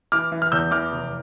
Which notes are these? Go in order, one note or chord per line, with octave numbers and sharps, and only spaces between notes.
E3 D6 F6
E3
F6
E2 E6 G6
E3 D6 F6
F1